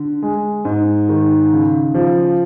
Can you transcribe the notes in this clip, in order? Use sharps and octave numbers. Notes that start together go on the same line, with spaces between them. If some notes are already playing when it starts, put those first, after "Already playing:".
Already playing: D3
G#3
G#2
D#3
C#3
F3